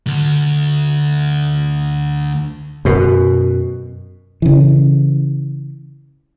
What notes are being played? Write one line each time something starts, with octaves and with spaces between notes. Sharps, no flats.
D2 D3
F#2 B2
C#3 E3